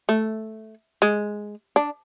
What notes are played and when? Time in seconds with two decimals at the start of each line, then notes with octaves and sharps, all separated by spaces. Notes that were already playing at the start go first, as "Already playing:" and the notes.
0.09 A3
1.02 G#3
1.76 D4